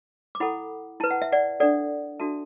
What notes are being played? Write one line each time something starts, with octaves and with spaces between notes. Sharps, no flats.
D6
E4 A4 F#5 B5
E4 B4 A5
F#5
E5
D5 F#5
D4 A4 D5 F#5
D4 F#4 A4 E5 A5